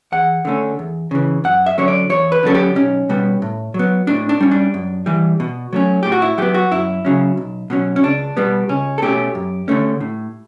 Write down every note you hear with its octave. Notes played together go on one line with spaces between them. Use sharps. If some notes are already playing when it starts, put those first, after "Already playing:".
E2 F#5
D3 A3 C#4
E2
C#3 E3
F#2 F#5
E5
D3 F#3 C#4 C#5
D5
E2 C#5
B4
D3 F#3 C#4 A4
G4
B1 C#4
B2 G3 B3
A2
F#3 B3
A2 D4
D4
G3 C#4
D4
F#2
E3 G3
B2
F#3 A3 C#4
A2 G4
F#4
E4
F#3 B3 G4
F#4
F#2 E4
C#3 F#3 C#4
B1
B2 F#3 C#4
C#4
C#2 D4
B2 G3 B3
C#2 C#4
A4
B2 A3 C#4 G4
F#2
D3 A3 C#4
A2